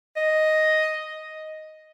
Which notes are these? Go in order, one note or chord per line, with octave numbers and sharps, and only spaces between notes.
D#5